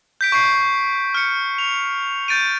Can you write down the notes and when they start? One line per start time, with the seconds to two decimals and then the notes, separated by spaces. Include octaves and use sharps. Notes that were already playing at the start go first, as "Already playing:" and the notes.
0.21 G6 B6 D7
0.32 C#6 G6 C7
1.15 F6 C#7
1.58 F7
2.28 G6 A6 D7 D#7